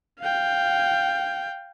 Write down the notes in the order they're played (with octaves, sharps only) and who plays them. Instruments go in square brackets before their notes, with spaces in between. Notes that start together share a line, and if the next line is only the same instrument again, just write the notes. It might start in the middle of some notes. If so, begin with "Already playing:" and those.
[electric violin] F5 G5